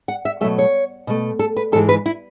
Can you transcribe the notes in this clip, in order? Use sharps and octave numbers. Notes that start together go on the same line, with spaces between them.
F#5
E5
B2 F#3 A3 E5
C#5
B2 A3
A4
B4
G#2 E3 G#3 A4
B4
E4